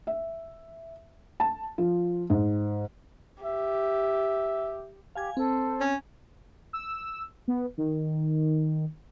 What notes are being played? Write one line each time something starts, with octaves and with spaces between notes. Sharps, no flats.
E5
A5
F3
G#2
G4 E5
G4 F5 G#5 G#6
C4 A4 C5
C#4
E6
B3
D#3